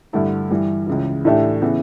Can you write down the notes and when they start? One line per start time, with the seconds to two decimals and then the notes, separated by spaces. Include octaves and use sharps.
0.13 G2 D3 A3 E4 A4
0.51 G2 E3 G3
0.87 C#2 C#3 E3
1.25 A2 E3 A3 D4 G4
1.62 C#3 E3 B3